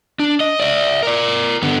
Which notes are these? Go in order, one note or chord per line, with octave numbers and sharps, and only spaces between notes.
D4
D#5
D5 E5
A#4 D5
D3 B3